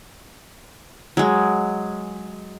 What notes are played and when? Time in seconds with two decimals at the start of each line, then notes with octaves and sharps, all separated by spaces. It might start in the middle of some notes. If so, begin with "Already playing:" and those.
1.17 F#3 G#3